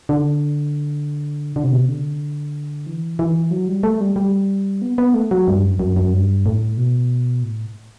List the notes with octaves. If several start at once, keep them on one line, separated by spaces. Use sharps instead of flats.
D3
D3
C3
B2
C3
D3
E3
E3
F#3
G3
A3
G3
G3
B3
B3
A3
F#3
G2
F#2
F#2
F#2
G2
A2
B2
A2